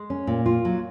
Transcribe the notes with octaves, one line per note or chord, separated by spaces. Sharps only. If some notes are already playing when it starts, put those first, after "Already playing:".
Already playing: G#3
C#4
A#2
F4
F#3